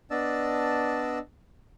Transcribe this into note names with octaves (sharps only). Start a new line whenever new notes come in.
B3 D4 D5 D#5 A5 E6